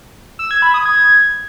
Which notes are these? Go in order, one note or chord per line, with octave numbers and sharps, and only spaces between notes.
E6
G#6
B5
D#6
G#6